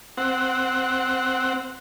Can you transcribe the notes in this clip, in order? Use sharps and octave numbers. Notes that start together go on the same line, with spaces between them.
C4 F#5